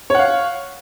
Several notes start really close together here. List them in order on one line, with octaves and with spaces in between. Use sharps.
C#5 F#5 F5